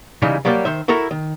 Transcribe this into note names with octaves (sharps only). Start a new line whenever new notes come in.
C#3 E3 G3 G#3 D#4
F#3 G3 A#3 G4 D5
D#3 C5 E5
E4 F#4 A4 A#4 E5
D#3